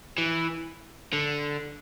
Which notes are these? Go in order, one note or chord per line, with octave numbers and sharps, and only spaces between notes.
E3
D3